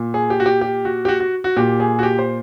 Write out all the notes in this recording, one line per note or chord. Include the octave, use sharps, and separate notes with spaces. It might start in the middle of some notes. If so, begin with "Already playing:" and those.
Already playing: A#2
G#4
G4
F#4
G4
G4
F#4
G4
F#4
F#4
F#4
A#2 G4
G#4
F#4
G4
C5